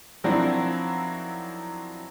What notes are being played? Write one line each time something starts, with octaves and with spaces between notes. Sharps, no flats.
D#3 F3 F#3 C4 D4 E4